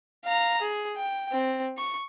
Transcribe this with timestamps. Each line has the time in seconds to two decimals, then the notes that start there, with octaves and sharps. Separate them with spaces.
0.24 F5 A#5
0.61 G#4
0.96 G5
1.32 C4
1.77 C#6